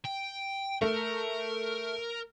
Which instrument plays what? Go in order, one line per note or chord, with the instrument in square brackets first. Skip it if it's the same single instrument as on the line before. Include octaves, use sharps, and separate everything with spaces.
[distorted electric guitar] G5
[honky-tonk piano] A3 [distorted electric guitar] A#4